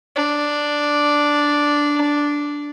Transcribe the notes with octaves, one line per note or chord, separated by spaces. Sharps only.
D4